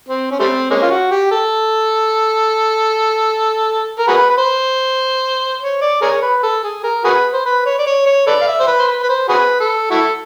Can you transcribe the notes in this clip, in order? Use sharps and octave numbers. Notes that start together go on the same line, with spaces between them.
C4
C#4
G3 A3 C4
G#3 A#3 C#4
F4
F#4
G4
A4
A#4
F#4 G#4 B4
B4
C5
C#5
D5
G#4 A#4 C#5
B4
A4
G#4
A#4
F#4 G#4 B4
C5
B4
C#5
D5
C#5
C#5
A4 B4 D5
F5
E5
C5
B4
C5
B4
B4
C5
F#4 G#4 B4
A4
E4 F#4 A4